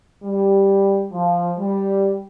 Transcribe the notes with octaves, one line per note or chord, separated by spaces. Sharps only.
G3
F3
G3